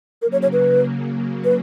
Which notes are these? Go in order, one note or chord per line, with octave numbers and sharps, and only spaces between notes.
C#3 F#3 A#3 A#4
C#5
C#5
B4
B4